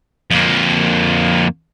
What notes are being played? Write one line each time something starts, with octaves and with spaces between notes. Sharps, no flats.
F2 A#3